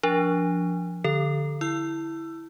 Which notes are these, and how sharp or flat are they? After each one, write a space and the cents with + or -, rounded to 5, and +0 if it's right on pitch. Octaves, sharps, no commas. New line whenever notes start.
F3 +0 D4 -20
D3 +0 A4 +0
E4 +0 E6 +20